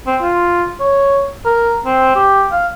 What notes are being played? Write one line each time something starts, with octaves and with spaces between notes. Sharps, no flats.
C4
F4
C#5
A#4
C4
G4
F5